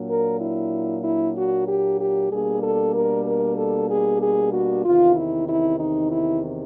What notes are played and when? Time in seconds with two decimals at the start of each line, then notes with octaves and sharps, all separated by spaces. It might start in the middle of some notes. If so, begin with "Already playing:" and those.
Already playing: A#2 F#3 A#3 D4
0.09 A#4
0.40 E4
1.04 E4
1.36 F#4
1.68 G4
1.99 G4
2.31 B2 G3 A#3 D4 G#4
2.63 A4
2.94 A#4
3.26 A#4
3.57 A4
3.89 G#4
4.22 G#4
4.52 F#4
4.84 E2 C3 D#3 F4
5.16 E4
5.48 E4
5.80 D#4
6.11 E4